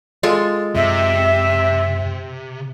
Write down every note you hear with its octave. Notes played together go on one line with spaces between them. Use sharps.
G#3 F4 A4
F#2 C3 E5